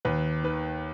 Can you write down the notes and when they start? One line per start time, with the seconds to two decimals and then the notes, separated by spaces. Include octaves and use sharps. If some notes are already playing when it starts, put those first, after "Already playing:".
0.05 D#2 B4
0.44 D#3 B4